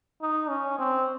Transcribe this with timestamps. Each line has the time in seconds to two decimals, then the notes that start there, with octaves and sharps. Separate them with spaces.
0.22 D#4
0.49 C#4
0.79 C4